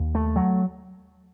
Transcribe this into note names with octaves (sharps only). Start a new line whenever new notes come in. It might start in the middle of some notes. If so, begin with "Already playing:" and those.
Already playing: D#2
A3
F#3